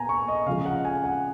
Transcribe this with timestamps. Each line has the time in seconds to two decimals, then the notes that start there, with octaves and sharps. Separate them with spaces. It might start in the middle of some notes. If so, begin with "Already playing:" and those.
Already playing: A#2 B3 G#5 A#5
0.09 C#6
0.28 D#5
0.46 C#3 F3 G#3 F5
0.66 F#5
0.85 G#5
1.04 F#5